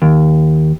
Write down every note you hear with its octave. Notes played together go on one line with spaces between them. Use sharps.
D#2